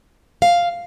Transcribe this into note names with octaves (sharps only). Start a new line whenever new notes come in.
F5